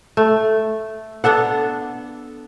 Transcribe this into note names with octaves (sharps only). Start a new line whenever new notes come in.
A3
B3 D4 A4 F#5